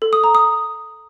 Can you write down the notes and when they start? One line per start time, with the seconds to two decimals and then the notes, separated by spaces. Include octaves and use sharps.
0.02 A4
0.13 D#6
0.24 A#5
0.35 D#6